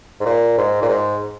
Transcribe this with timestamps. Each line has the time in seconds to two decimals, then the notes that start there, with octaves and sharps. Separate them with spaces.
0.20 G#2
0.26 A#2
0.58 G#2
0.82 A#2
0.89 G#2